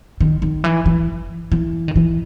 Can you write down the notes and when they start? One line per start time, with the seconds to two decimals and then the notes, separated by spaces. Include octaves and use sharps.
0.21 D#3
0.42 D#3
0.64 E3
0.86 E3
1.52 E3
1.88 D#3
1.96 E3